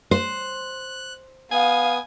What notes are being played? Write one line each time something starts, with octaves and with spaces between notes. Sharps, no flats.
C5 F#6
B3 F5 G#5 D#6